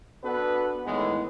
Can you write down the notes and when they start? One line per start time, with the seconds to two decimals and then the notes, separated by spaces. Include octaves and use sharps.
0.23 B3 D4 F#4 A4 B4
0.85 A2 D#3 E3 G#3 B3